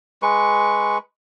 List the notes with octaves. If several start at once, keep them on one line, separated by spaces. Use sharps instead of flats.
G#3 B4 C#6